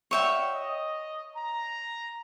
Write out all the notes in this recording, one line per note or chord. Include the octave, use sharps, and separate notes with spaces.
F#4 C#5 D5 E5 F5 G5
D#5
A#5